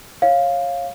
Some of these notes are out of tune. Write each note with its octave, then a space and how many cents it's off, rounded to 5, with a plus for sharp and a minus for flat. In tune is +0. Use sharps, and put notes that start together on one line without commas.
C#5 -20 F5 +0